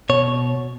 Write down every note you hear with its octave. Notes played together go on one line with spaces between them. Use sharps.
B2 C#5